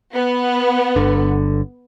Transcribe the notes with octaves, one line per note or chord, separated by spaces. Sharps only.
B3
G1 D3